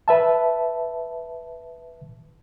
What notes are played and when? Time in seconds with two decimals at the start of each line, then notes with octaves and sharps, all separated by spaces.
0.08 B4 E5 A5